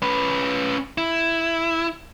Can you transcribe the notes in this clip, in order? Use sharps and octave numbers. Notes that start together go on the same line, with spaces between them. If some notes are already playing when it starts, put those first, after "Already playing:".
C#4 B4
E4